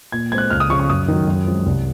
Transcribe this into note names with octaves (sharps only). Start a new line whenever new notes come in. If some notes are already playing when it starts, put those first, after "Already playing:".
A#2 G#6
G#3 C4 F#6 G#6
C#2 F6
D#6
C#3 F3 C#6
C#6
F#2 D#6
D#3 F#3
F#2
F3 G#3 C4
C2